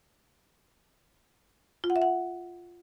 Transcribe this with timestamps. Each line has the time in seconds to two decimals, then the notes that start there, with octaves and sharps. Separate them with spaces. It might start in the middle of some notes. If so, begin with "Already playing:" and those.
1.84 F4
1.90 F#5
1.96 E5
2.02 F#5